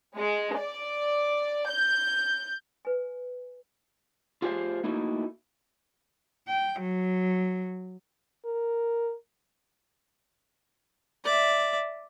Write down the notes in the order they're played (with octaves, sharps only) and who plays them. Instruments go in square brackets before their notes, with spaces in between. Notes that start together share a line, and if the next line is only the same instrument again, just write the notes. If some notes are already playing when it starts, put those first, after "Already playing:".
[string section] G#3
D5
G6
[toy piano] B4 G#5
[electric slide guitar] F4 G4 G#4 A#4 C5 F5
A3 A#3 D#4 E4 F#4
[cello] G5
F#3
[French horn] A#4
[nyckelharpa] D5 E5